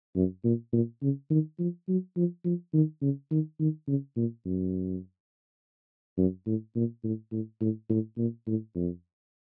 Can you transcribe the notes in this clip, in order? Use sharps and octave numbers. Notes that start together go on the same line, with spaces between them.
F#2
A#2
A#2
C#3
D#3
F3
F#3
F3
F3
D#3
C#3
D#3
D#3
C#3
A#2
F#2
F#2
A2
A#2
A2
A2
A2
A2
A#2
A2
F2